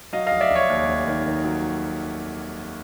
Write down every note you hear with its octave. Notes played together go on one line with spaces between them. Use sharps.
F#3 D#5 F5
D#5 F5
F1
D5 E5
F1 C#5 D#5
D#2
F1
D#3
D#3
F#3